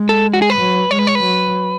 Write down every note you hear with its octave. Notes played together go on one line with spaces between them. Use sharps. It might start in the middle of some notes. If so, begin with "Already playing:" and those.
Already playing: G#3
A4
F#4
G#4
B4
F#3
G#3 C#5
B4
C#5
B4
F#3